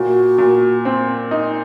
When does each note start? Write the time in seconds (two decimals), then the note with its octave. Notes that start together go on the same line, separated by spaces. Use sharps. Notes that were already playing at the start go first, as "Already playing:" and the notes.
Already playing: A#2 F#4
0.38 A#2
0.85 C4
1.31 D#4